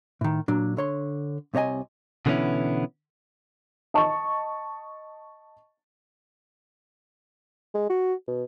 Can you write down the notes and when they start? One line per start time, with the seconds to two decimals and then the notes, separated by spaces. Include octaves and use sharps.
0.21 A2 D#3
0.48 A#2 F#3 D4
0.77 D3 C#5 C6
1.54 C2 C3 C#5 D#5 G#5
2.26 B2 D3 E3 B3 C#4 E4
3.94 D#5 A5 C#6
7.74 G#3
7.90 F#4
8.28 B2